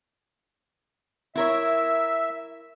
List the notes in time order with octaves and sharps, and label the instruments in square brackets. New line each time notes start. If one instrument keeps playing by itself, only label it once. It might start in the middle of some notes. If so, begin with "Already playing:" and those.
[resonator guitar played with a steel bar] E4 A#4 C#5 [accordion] E5